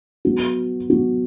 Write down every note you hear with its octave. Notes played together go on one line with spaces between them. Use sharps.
F#3 B3 F#4
F#3 B3 F#4